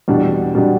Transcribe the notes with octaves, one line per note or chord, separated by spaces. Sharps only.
E2 B2 G3 D4
B2 G3 D4